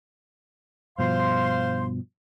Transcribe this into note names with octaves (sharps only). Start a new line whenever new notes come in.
G2 B2 F3 C5 F5 C6